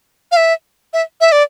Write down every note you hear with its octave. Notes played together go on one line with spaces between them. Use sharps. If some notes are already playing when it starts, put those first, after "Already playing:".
F5
E5
E5
E5
D5